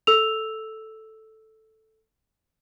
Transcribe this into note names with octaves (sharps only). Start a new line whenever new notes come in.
A4 E6 F7